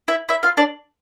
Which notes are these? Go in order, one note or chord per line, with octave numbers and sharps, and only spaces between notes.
E4 E5
E4 E5
F4 F5
D4 D5